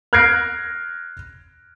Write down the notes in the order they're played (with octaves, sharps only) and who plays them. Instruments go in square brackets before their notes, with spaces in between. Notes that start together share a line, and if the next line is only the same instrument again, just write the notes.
[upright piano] F6 F#6 G#6 A#6 C7 D7